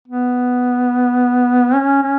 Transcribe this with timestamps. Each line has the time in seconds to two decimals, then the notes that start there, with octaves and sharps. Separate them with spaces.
0.08 B3
1.75 C#4
2.03 C#4